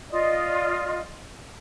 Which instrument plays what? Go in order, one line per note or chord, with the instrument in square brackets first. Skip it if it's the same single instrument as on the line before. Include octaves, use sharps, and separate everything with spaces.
[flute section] F4 D5 D#5